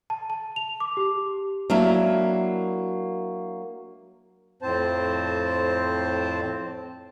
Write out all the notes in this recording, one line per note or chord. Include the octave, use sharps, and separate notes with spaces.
A5
A5
F7
D6
G4
F#3 A#3 D4 E4 A#4
F2 A2 C4 C5 A5